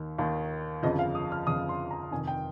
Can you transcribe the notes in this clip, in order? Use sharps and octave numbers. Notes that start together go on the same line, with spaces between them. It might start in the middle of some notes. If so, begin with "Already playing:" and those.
Already playing: D#2 D#3
D#2 D#3
G1 F2 C#3 F3 D#5
F5
D#6
F6
G1 F2 C#3 F3 D#6
C6
A#5
F1 F2 D#3 G#5
G5